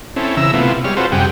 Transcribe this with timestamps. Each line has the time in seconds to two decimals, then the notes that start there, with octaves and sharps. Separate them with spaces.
0.16 C4 C#4 E4 A4
0.37 C#3 E3 E5 A#5 E6
0.53 C3 A3 B3 E4 F4
0.84 G3 G#3 C#5 F6
0.97 C4 F4 F#4 A4 B4 C5
1.12 F#2 C3 G3 G#4 F#5 G5